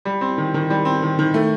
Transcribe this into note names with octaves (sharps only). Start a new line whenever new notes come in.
G3
C4
D#3
D#3
G3
C4
D#3
D#3
A3